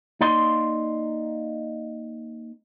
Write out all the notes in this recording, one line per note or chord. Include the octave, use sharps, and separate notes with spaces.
A#3 D#4 D5 D#5 F5 C6